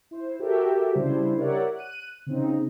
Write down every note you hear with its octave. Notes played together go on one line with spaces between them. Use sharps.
E4 C5
F#4 G4 A4 A#4 E5
C#3 G3 D4 E4 C5
G4 A#4 C#5 D5 E5 F#5
F#6 D#7
C#3 C4 D#4